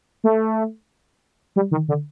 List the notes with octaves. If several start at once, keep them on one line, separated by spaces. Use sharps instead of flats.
A3
G3
D#3
D3